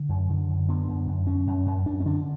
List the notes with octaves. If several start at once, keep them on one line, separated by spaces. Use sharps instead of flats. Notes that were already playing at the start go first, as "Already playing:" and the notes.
Already playing: D3
F#2
D3
F#2
D3 B3
F#2
F#2
F#2 C#4
F#2
F#2
F#2 D4
C#4
D3 D4